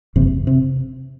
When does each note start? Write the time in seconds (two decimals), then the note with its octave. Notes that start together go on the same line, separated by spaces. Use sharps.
0.16 F#1 E2 C3
0.47 C3